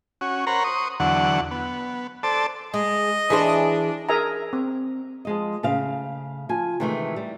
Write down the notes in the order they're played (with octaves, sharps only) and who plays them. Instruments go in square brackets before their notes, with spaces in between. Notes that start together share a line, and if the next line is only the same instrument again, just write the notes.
[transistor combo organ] C#4 F#4
A#4 C5 C#5 F#5 A#5 B5
C5 C#6 D#6
E2 D3 F#3 F#5
B3
A4 C5 D5 A5
[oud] G#3 [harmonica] D#5
[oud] E3 G#4 C5 [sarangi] D4
[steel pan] G#4 A#4 D#5 E5 G#5 A#5
C4
[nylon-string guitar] F3 G#3 D#5
A2 C#3 C5 F5
F3 G#5
C3 D#3 E3 G#3 A3
G3